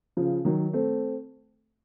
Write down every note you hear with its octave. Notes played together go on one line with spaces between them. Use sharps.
C#3 F3
D#3 F#3
A3 C4